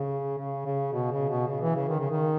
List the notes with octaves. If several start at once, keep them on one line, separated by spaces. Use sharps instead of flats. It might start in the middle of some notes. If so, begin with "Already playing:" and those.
Already playing: C#3
C#3
C#3
B2
C#3
B2
C#3
E3
C#3
D#3
C#3
D#3